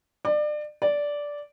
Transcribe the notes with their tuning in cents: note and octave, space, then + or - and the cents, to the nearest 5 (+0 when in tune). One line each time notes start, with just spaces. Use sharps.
D5 +30
D5 -10